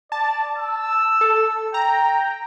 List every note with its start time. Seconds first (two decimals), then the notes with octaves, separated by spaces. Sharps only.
0.12 D5 A5
0.58 E6
1.21 A4
1.74 G5 A#5